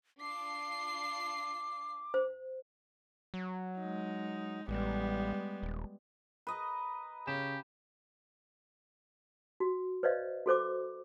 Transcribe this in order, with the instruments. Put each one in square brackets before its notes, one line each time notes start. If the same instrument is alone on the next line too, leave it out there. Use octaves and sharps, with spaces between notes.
[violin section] D4 F4 C7 [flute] D6
[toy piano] C5
[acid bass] F#3
[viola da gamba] G#3 D#4
[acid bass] A1 [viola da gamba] G3 G#3 B3
[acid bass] D#1
[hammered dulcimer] B4 D#5 A#5
[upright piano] C#3 C#4 E7 [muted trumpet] G4
[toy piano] F#4
B4 C5 D5 D#5 F5
F#4 A4 C5 D6